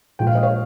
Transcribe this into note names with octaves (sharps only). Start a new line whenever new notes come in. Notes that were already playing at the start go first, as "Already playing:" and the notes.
A#1 A#2 F3 G#3 G5
F5
D#5
C#5 F5